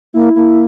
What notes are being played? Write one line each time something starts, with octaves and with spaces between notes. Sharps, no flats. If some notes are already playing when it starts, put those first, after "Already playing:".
A#3 E4
A#3 E4